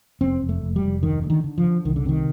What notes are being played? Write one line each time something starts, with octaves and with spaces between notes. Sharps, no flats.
F1 C4
F1
A3
F1
G3
F1
D2 D#3
D3
D#3
D3
F3
D3
C2 D#3
D3
C3 D#3